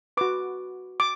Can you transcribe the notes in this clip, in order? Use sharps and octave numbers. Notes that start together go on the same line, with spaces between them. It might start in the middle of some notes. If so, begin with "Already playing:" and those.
F#4 B4 D6
D6